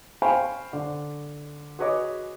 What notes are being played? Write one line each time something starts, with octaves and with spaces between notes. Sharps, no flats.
C5 F5 G5 G#5 B5 C#6
D3
F#4 G#4 B4 C#5 D#5 D6